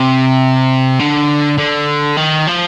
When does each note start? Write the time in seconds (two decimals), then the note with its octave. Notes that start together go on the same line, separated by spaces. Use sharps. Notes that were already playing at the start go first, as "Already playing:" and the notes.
Already playing: C3
0.99 D3
1.58 D3
2.17 D#3
2.47 F3